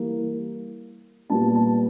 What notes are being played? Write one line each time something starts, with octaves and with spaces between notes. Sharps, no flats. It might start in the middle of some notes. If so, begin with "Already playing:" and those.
Already playing: E3 G3 A#3
A#2 G3 B3 A5
A5